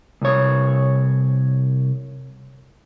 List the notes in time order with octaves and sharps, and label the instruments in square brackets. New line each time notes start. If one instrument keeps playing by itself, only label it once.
[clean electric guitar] C2 C#5